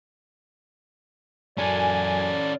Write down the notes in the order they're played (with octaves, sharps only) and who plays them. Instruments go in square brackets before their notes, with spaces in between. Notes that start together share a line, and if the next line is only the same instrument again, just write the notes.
[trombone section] F#2 [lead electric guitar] C#4 A4 [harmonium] D5 [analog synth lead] G#5